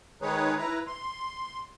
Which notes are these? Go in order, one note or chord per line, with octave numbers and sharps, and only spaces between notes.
D#3 G#3 D#4 G#4 B4 C#5
E4 B4 A#5
C6